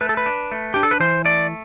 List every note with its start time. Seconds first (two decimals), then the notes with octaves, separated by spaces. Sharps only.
0.01 A3 B4
0.09 A4
0.17 B4
0.26 D4
0.52 A3
0.74 D4 G4
0.83 A4
0.91 B4
1.00 E3 C5
1.25 A3 D5